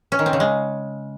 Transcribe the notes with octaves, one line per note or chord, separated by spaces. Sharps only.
C#4
D#3
C4
C#3
G#3